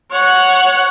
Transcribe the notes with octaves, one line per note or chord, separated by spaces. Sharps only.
C#5 F#5